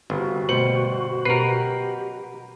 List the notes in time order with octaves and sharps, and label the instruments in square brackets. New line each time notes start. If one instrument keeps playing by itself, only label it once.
[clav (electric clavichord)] G1 [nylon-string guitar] C#3 C4 [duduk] F#4
[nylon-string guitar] B2 G3 A3 [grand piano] C5 C#7 F#7
[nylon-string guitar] B2 F#3 C#4 [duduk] G4 [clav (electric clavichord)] A#4 B4 [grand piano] C7